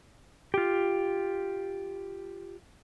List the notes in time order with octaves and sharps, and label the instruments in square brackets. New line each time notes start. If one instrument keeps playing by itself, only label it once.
[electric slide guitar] F4 G4